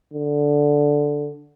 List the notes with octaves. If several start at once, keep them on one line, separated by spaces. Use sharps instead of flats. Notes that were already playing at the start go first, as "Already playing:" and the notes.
D3